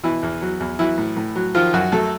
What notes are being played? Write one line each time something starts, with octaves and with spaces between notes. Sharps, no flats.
B2 E3 E4
E2
F#3
E2
E3 F#3 E4
A2
A2
F#3
D#3 F3 F4
F#2 F#3 F#4
F#3 A3 A4